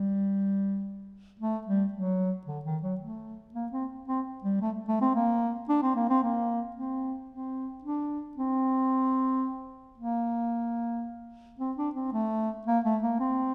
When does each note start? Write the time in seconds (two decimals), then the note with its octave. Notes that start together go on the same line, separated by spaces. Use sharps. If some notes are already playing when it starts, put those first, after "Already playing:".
Already playing: G3
1.40 A3
1.67 G3
1.93 F#3
2.47 D3
2.65 D#3
2.83 F#3
3.01 A3
3.54 A#3
3.72 C4
4.08 C4
4.44 G3
4.61 A3
4.88 A3
5.02 C4
5.15 A#3
5.69 D4
5.83 C4
5.96 A#3
6.09 C4
6.23 A#3
6.77 C4
7.30 C4
7.84 D4
8.37 C4
9.98 A#3
11.59 C4
11.77 D4
11.95 C4
12.13 A3
12.67 A#3
12.84 A3
13.03 A#3
13.20 C4